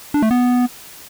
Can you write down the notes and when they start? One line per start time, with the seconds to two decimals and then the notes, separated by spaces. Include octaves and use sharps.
0.14 D4
0.22 A3
0.31 B3